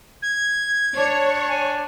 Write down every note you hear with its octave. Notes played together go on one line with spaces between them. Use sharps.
G#6
D4 C#5
G#5